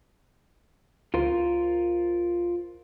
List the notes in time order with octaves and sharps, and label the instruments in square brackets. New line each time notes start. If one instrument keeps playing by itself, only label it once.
[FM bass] C#2 [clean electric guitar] F4 A#4 C5